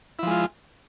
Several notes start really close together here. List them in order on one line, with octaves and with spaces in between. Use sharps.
E4 F3 G#3 F4